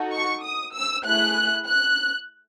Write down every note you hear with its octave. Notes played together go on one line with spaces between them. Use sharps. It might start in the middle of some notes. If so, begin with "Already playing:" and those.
Already playing: D#4 F#4 A4
C#6
D#6
E6
A3 E4 G#4 F#6
F#6